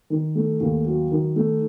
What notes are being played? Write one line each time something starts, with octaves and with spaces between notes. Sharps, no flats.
D#3
A3
D#2
F#3
D#3
A3